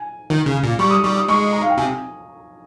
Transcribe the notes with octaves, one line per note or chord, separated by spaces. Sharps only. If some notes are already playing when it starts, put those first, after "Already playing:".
Already playing: G#5
D#3
C#3
A#2
G3 C#6
D#6
G3 C#6
D#6
G#3 C#6
A#5
F5
G5
C3 G#5